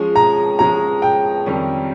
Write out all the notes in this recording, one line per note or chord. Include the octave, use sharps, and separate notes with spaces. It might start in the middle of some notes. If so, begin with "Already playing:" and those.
Already playing: F3 G#3 C#4 G#4
A#5
F3 G#3 C#4 G#4 A#5
G5
F2 D#3 G3 C#4